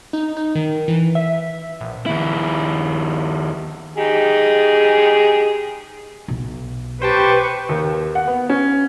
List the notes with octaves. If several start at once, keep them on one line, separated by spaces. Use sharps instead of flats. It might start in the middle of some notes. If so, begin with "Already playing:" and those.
D#4
D#4
D#3
E3
E5
A#1
D#2 E4
D#4 G4 G#4
B1
G4 B4 C5 G5 A5 C#6
D#2
F#5
B3
C#4